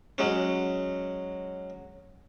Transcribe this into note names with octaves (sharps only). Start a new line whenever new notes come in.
F#3 G#3 C#4